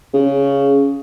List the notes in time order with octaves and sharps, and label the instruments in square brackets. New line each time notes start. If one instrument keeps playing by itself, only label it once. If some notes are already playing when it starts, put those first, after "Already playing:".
[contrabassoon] C#3